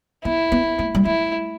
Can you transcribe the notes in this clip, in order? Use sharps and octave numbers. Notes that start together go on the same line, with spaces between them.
B3 E4
B3
A3
G3
A3 E4